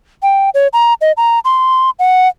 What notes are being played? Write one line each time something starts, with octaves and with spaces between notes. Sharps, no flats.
G5
C#5
A#5
D#5
A#5
C6
F#5